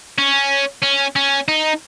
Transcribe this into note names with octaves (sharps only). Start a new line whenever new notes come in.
C#4
C#4
C#4
D#4